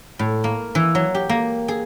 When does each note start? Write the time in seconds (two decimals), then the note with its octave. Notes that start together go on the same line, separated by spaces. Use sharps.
0.19 A2
0.44 A#3
0.75 E3
0.95 F#3
1.15 G4
1.29 A#3
1.68 G#4